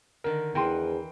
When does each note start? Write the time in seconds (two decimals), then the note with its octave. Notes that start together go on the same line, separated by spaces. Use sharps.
0.24 D3 D#3 A#4
0.55 E2 E3 A#4 B4 G5 C6